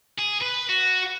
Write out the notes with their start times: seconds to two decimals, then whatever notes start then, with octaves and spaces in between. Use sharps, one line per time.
0.18 G#4
0.41 B4
0.69 F#4